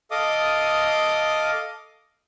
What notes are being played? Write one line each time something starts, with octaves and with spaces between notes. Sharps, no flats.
A4 D#5 F5 D6 D#6